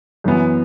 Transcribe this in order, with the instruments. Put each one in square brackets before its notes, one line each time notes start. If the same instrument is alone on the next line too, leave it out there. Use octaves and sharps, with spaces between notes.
[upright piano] F#2 E3 B3